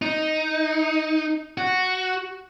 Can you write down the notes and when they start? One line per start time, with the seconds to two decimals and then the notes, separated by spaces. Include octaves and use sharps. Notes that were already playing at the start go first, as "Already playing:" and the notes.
0.02 D#4
1.58 F#4